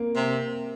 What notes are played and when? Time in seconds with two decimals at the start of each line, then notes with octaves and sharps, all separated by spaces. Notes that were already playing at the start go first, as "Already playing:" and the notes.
Already playing: A#3 C4
0.16 C3